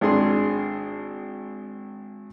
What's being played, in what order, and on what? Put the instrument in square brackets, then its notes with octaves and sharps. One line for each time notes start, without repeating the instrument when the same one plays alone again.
[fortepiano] G#1 D4 G#4 C6